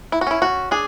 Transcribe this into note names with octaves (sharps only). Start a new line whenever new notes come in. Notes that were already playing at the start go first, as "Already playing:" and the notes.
E4
F#4
C#4 E4
F#4
D4 G#4